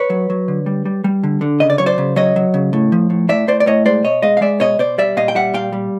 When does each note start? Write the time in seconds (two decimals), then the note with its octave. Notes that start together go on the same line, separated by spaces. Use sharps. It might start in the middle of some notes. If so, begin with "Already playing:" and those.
Already playing: B4 C#5
0.10 F#3
0.30 F#3
0.48 D3
0.66 G3
0.85 G3
1.04 G3
1.24 D3
1.41 D3
1.60 C#3 D#5
1.70 D5
1.78 F#3 C#5
1.86 C5 D5
1.98 C#3
2.16 F#3 C#5 D#5
2.36 F#3
2.54 C#3
2.73 A2
2.92 F3
3.10 A2
3.29 A2 D5 E5
3.47 A2 C5 D5
3.60 D5
3.66 A2 C#5 D#5
3.85 G#3 C5 D5
4.04 B2 C#5 D#5
4.22 G#3 D#5 F5
4.37 F5
4.41 G#3 D5 E5
4.60 B2 C#5 D#5
4.79 B2 C5 D5
4.98 G3 D5 E5
5.17 A#2 D#5 F5
5.28 G5
5.35 G3 E5 F#5
5.54 A#2 F5 G5
5.73 G3